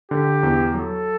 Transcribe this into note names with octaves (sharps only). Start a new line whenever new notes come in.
D3 G4
E2
F#3 A4